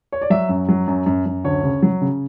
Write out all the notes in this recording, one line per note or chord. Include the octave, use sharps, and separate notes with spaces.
C#5
D5
F#3 E5
F#2
F#3
F#2
F#2
F#2
D2 C#5
C#3
F#3
C#3